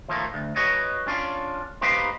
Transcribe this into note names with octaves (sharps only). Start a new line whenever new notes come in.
D#2 F3 A3 A#3
D2
F#4 B4 C#5 D#5
C#4 D4 F4
A#3 B3 D#4 G4 B4 C5